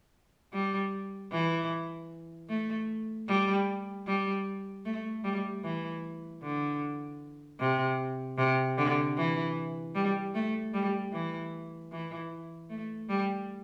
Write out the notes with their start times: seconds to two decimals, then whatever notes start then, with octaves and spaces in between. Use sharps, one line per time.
0.53 G3
1.32 E3
2.49 A3
3.28 G3
4.07 G3
4.85 A3
5.24 G3
5.64 E3
6.43 D3
7.60 C3
8.38 C3
8.78 D3
9.17 E3
9.95 G3
10.34 A3
10.74 G3
11.13 E3
11.91 E3
12.70 A3
13.09 G3